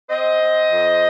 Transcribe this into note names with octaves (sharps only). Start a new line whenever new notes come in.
C4 C5 D#5
C4
F2